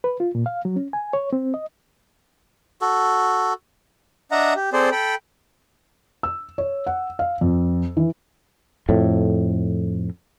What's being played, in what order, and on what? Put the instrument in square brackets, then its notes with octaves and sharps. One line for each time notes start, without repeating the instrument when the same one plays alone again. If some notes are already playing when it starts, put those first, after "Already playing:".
[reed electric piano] B4
F4
A#2
F5
F#3
C#4
G#5
C#5
C4
D#5
[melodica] F#4 A4
[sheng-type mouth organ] D4 D#5 E5 F#5 A#5
G4
C4 G#4 A4 C5 D5
A4 G5 B5
[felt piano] E6
C#5
F#5
F5
F2
E3
[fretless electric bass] F2 A2